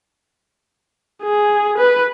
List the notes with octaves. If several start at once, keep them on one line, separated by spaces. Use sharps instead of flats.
G#4
B4